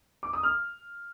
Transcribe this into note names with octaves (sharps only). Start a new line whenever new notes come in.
D6
D#6
F6